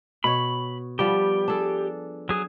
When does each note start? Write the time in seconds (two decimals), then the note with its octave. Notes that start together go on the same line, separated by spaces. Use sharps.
0.24 B2 C#5 B5
0.99 F3 G3 B3 G4
1.48 D4 G#4 A4
2.29 F#3 G#4